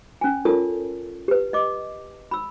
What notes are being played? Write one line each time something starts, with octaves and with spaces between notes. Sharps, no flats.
C#4 G#5
F4 A4 A#4 C#5 A5 D#6
G4 B4
D#5 D6
B5 E6